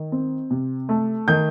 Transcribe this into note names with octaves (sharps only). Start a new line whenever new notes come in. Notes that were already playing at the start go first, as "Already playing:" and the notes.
Already playing: D#3
C4
C3
A3
D#3 G6